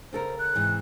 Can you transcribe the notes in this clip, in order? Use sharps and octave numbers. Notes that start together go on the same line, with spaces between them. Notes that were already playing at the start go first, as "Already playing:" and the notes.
C#3 A4 A#4 C5
F#6
G#2 C3 E3